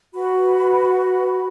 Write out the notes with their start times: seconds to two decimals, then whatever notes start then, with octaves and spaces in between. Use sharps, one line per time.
0.14 F#4 B4 B5
0.92 C#6
1.00 B5